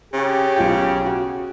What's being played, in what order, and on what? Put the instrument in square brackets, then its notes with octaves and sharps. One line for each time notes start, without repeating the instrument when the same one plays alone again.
[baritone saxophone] C#3 [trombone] G4
[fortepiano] B1 F4 G5
F#4